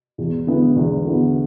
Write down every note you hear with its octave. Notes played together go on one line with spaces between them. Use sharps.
E2
D3 B3 E4
E2
D3 B3 E4